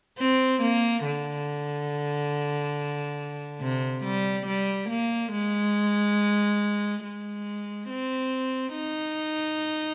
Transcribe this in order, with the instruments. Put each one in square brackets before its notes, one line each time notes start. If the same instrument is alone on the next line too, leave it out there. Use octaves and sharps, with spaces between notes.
[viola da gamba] C4
A#3
D3
C3
G3
G3
A#3
G#3
G#3
C4
D#4